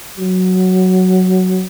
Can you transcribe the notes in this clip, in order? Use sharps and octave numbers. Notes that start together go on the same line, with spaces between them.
F#3